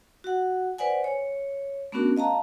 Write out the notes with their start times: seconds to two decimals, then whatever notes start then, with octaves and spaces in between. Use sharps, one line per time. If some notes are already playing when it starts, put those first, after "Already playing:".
0.24 F#4 F#5
0.78 B4 C5 D5 F#5 G#5
1.04 C#5
1.92 A3 B3 C#4 D4 F#4 A#4
2.17 D#5 F5 A5 A#5